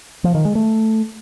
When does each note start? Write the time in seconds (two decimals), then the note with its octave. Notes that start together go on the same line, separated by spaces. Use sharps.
0.24 F3
0.35 D#3
0.45 G#3
0.55 A3